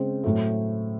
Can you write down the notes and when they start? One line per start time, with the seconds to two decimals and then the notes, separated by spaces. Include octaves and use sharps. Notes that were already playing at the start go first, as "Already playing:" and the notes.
Already playing: C#3 G#3 C4 C5
0.24 A2 F#3 A3